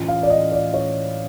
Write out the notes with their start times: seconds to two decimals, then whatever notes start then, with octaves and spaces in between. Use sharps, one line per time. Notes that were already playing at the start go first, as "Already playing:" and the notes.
Already playing: A2 E3 C#4 F4
0.08 F5
0.23 D5
0.30 D#5
0.52 D5
0.74 C#5